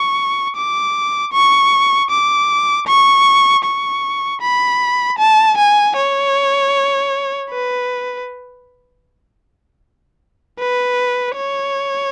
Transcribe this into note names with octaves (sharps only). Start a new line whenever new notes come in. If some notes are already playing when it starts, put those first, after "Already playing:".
Already playing: C#6
D6
C#6
D6
C#6
C#6
B5
A5
G#5
C#5
B4
B4
C#5